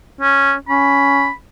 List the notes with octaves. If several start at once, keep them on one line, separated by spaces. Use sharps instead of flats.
C#4
C#4 B5